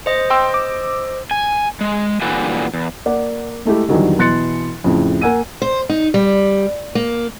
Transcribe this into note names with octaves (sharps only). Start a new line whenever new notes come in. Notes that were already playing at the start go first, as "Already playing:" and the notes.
C5 D#5
G5 C6 E6
D6
G#5
G#3
A#2 D3 E3 G3 F#4 G#5
E2
A#3 D5 F#5
G#3 A3 E4 G4
E2 D3 D#3 F#3 G3
B2 E3 C6 F#6 A6 C#7
F2 A2 C#3
A#3 F#5 G#5 E6 D#7
C5
D#4
G3
A#3